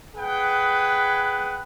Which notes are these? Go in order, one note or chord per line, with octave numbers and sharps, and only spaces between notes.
G#4 B4 F#5 G5